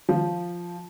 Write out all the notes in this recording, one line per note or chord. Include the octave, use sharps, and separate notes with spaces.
F3